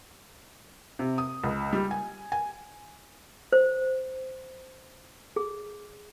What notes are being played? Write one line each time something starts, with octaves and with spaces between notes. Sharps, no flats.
C3
D#6
C#2
G3
G#5
G#5
C5
G#4